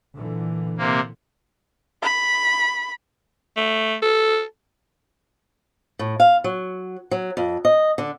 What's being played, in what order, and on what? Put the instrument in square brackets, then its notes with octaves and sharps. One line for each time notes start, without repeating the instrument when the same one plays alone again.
[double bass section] A#2 D3 E3
[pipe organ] C3 A#3
[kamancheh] B5
[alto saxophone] A3
A4
[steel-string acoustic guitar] A2
F5
F#3
F#3
F2
D#5
D3